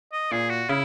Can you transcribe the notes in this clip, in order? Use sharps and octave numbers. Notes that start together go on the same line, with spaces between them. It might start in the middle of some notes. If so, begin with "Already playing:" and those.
D#5
A#2 G#4
F#4
C#3 E4